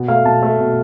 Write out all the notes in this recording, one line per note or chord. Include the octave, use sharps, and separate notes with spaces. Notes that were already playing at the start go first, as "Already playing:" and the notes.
Already playing: B2
A3 F5
B2 A5
A3
B2